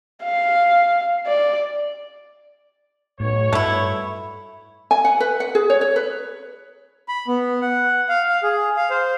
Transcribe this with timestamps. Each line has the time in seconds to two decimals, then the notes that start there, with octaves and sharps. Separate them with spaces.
0.24 F5
1.26 D5
3.20 B1 A2 C#5
3.53 G2 A3 E4
4.91 G#5
5.05 F#5
5.20 B4
5.40 F#5
5.55 G#4
5.70 C#5
5.81 C#5
5.96 B4
7.08 B5
7.28 B3
7.61 F#5
8.09 F5
8.28 F5
8.43 G#4
8.77 F5
8.90 C5